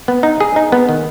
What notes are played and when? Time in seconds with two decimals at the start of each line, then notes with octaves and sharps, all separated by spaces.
0.08 B3
0.23 D#4
0.40 G#4
0.56 D#4
0.72 B3
0.89 D#3